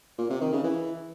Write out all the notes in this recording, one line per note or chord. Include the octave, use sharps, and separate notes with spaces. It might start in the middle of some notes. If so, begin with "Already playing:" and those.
A#2
C3
D#3
C#3
E3